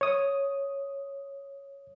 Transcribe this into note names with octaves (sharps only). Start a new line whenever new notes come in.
C#5 D#6